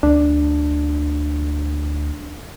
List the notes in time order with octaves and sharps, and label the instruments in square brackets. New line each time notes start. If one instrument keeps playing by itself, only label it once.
[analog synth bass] D2 [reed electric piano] D4